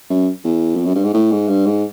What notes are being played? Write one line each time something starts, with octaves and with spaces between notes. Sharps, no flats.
F#2
E2
F2
F#2
G2
G#2
A2
G#2
G2
G#2